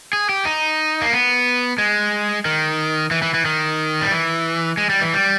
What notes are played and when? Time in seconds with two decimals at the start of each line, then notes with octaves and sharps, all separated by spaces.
0.13 G#4
0.29 G4
0.45 D#4
1.02 A#3
1.12 B3
1.78 G#3
2.45 D#3
3.11 E3
3.22 E3
3.34 E3
3.45 D#3
4.01 G3
4.11 E3
4.77 G#3
4.89 G3
5.01 E3
5.14 G3